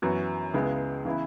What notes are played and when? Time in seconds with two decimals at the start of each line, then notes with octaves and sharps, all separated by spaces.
0.02 F#2 E3 B3 F#4
0.54 C#2 C#3 G#3 B3 E4
1.05 C#3 E3 B3 E4